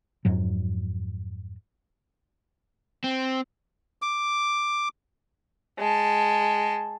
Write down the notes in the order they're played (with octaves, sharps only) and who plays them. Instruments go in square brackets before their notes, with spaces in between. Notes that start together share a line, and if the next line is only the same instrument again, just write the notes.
[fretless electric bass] F2 G#2 F#3
[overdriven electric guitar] C4
[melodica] D6
[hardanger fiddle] G#3 A5